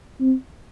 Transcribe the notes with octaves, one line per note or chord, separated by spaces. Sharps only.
C4